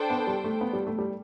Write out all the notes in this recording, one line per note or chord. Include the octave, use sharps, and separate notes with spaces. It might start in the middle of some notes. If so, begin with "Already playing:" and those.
Already playing: D4 A4 C5 G5
B3
G3
A3
B3
G3
A3
G3